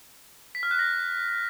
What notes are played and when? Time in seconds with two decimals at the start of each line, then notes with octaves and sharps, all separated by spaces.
0.55 B6
0.63 F6
0.71 F#6
0.79 A#6